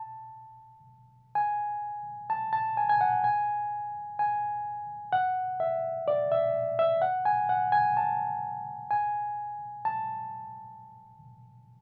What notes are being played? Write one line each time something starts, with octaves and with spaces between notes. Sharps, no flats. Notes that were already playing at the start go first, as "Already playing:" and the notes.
Already playing: A5
G#5
A5
A5
G#5
G#5
F#5
G#5
G#5
F#5
E5
D5
E5
E5
F#5
G#5
F#5
G#5
A5
G#5
A5